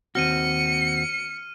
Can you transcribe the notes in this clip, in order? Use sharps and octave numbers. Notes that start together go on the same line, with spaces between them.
D#2 C4 F#4 F6 C#7 D#7